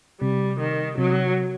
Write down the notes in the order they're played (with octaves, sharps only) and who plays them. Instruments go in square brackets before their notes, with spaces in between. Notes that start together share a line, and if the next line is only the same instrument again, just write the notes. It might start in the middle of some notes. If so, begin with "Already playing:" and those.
[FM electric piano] C3 [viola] G3
[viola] D#3
[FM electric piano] C3 [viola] F#3